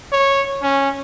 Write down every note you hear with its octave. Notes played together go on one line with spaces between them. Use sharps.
C#5
C#4